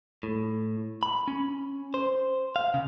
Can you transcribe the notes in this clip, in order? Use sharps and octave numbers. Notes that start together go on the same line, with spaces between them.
A2
B5
C#4
C5
F5
C#3